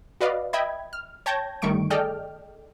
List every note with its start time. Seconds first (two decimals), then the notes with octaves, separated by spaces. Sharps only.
0.21 F#4 B4 D5 D#5 F5
0.53 D#5 E5 G5 B5 G#6
0.93 F6
1.26 C#5 G5 A5 G6 G#6 A#6
1.62 G1 D#3 G3 A3 C#6 D7
1.90 G#4 A4 D5 D#5 G5 F6